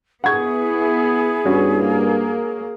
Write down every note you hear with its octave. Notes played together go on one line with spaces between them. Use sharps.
B3 E4 G#4 F#5 C#6 G#6
G2 C#4 F#4
A#3